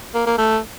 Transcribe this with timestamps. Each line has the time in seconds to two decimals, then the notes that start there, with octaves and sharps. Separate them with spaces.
0.14 A#3
0.26 A#3
0.38 A3